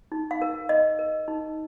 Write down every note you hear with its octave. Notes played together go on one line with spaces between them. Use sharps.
D#4
F5
A#4
D#4 D#5
A#4
D#4